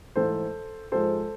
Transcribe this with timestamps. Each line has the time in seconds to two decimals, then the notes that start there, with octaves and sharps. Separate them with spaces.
0.16 G#2 E3 A3 A4 C5
0.92 G#2 F3 G#3 A4 C5